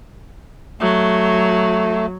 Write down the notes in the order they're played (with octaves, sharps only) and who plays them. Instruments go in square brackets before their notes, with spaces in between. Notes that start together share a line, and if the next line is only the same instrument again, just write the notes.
[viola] F#3 [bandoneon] A3